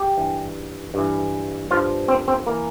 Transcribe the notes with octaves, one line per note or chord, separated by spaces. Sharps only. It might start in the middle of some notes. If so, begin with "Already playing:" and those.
Already playing: G4
G2 E3
G2 E3
G2 F3 F4
C4
C4
E3 A#3